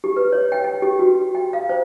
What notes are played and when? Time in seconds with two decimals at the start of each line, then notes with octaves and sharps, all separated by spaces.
0.04 G4
0.16 B4
0.33 C#5
0.52 G5
0.64 G5
0.82 G4
0.99 F#4
1.35 G5
1.53 F5
1.69 C5